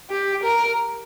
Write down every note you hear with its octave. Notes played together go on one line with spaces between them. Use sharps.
G4
A#4